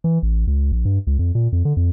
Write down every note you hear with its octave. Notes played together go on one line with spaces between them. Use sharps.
E3
A1
C#2
A#1
G2
C#2
F2
A#2
F2
D3
F2